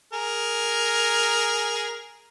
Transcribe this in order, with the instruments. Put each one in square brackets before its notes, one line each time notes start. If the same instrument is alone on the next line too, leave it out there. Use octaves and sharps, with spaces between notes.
[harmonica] G#4 A#4